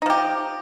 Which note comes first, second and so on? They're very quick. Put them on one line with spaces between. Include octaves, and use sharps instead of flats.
D#4 F3 G4